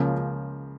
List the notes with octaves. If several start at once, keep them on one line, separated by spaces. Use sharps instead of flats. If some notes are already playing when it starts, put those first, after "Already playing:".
Already playing: C#2 C#3 F3 A#3